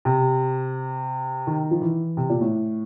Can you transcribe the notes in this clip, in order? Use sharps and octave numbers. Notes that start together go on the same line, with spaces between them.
C3
D#3
F3
E3
C3
A#2
A2